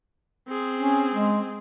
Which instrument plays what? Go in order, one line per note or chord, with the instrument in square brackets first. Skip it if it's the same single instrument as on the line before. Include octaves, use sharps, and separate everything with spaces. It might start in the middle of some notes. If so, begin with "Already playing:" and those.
[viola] C4 G#4
[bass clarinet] C#4
G#3